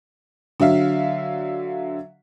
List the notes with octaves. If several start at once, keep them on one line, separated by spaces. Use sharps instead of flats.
D3 F#3 E5 F5